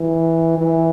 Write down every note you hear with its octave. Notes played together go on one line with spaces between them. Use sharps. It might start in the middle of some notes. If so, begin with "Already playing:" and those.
Already playing: E3
E3